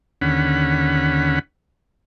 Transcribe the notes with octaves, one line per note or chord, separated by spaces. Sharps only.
D#2 D3 C#4 F#5 B5